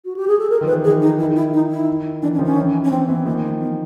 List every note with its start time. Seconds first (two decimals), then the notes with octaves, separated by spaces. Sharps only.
0.05 F#4
0.16 G4
0.28 G#4
0.39 A4
0.50 A#4
0.61 D#3 F3
0.67 B4
0.73 E3
0.84 D#3 G#4
1.02 D#4
1.19 E4
1.36 E4
1.54 D#4
1.70 E4
2.22 E3 D4
2.34 C#4
2.39 D#3 F3
2.45 C#4
2.57 E3
2.84 C#4
2.91 E3 C4
3.08 E3 B3
3.25 D#3 F3 A#3
3.43 A#3
3.60 B3